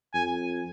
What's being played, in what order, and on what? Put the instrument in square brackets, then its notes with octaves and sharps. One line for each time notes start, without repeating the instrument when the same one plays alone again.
[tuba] F2 [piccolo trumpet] G#5